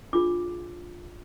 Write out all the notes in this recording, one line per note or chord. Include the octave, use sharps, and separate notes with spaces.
D4 F4 G#4 D6